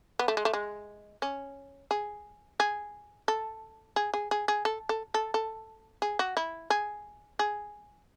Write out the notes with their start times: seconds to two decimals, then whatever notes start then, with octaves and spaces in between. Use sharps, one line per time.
0.19 B3
0.28 A3
0.37 G#3
0.45 A3
0.53 G#3
1.22 C#4
1.91 G#4
2.60 G#4
3.28 A4
3.96 G#4
4.14 G#4
4.31 G#4
4.48 G#4
4.65 A4
4.89 A4
5.14 A4
5.34 A4
6.02 G#4
6.19 F#4
6.37 E4
6.70 G#4
7.39 G#4